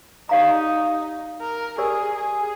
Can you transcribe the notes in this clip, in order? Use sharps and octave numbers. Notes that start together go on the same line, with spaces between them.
D#4 G4 D5 F5 A#5
A#4
G4 G#4 A#4 D5
G#4